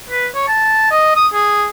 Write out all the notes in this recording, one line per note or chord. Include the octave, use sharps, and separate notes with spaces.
B4
C#5
A5
D#5
D#6
G#4